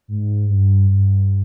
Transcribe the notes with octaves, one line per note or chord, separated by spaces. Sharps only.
G#2
G2
G2